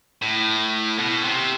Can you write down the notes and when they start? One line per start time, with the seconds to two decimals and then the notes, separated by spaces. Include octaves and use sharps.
0.22 A2
0.98 B2
1.24 C3